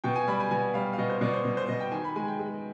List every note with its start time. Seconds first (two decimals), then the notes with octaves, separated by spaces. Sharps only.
0.04 B2 G5
0.16 G#5
0.28 G3 B5
0.40 G#5
0.51 B2 G#5
0.74 G3 F5
0.93 F5
0.98 B2 D#5
1.10 C5
1.21 B2 D5
1.34 C5
1.45 B2
1.57 C5
1.68 B2 D#5
1.80 G5
1.92 D#3 G#5
2.04 B5
2.16 G#3 G#5
2.28 G5
2.39 G#3